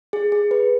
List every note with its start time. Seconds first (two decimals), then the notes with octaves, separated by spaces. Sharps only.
0.13 G#4
0.32 G#4
0.51 B4